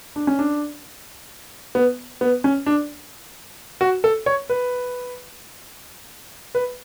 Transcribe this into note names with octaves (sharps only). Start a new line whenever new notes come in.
D4
C#4
D4
B3
B3
C#4
D4
F#4
A4
C#5
B4
B4